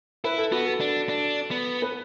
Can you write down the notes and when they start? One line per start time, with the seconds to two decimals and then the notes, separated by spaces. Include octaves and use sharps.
0.24 E4 B4
0.38 A4
0.52 B3 F#4
0.65 A4
0.80 D4
1.09 D4
1.51 B3
1.82 B4